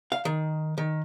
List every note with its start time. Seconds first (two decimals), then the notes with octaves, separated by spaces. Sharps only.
0.12 F5
0.25 D#3
0.78 D#3